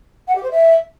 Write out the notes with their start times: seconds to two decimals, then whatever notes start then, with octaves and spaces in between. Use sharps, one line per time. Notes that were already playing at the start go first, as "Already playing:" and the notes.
0.27 F#5
0.35 G4
0.43 C5
0.51 E5